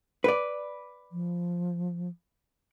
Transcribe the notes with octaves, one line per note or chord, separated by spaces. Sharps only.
B4 D5
F3